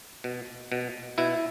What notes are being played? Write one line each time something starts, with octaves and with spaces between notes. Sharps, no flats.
B2
B2
B2 E4